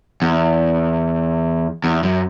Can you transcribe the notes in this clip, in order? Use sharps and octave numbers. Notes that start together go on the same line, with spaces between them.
E2
E2
F#2